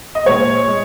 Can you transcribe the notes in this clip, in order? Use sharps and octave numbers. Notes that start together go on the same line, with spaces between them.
D#5
A#2 G#3 C#5
G#3